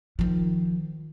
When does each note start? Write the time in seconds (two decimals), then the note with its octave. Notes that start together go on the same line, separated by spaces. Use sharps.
0.19 D#3 F3